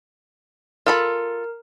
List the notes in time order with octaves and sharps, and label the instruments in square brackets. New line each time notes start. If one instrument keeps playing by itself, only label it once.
[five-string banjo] F4 A4 B5 [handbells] A#4